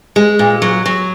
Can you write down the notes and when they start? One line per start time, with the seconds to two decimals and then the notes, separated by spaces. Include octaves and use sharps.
0.16 G#3
0.39 A#2
0.62 F#3
0.86 F#3